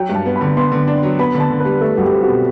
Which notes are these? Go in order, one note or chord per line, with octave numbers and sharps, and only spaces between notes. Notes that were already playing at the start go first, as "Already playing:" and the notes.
Already playing: F#3 G5
G2
A5
B3
B5
D3
B3 C6
D3
D4
F#3
B3 B5
D3
A5
D3
B4
G3
A3 A4
C2 F#4
G4
C4
F#4
B2